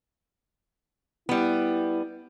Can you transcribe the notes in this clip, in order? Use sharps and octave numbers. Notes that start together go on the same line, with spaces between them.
G3 B3 E4